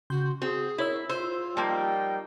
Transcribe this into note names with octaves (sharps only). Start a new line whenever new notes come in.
C#3 F#4 C6 G6
C4 F#4 G#4
E4 A#4 C#5 E6
F4 C5 E6
F3 G3 A#3 D#4 G5